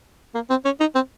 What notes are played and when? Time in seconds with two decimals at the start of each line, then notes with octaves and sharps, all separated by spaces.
0.35 A#3
0.50 C4
0.65 C#4
0.80 D#4
0.95 C4